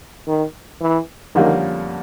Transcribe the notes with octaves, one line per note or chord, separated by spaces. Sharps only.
D#3
E3
F2 D3 D#3 G3 A#3 C#4